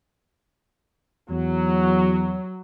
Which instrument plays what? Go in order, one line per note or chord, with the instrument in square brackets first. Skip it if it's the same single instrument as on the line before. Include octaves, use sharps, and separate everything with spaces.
[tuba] E2 [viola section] F#3